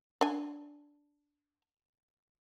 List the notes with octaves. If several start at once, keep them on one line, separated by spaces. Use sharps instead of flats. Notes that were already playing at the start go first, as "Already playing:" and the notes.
D4 G#5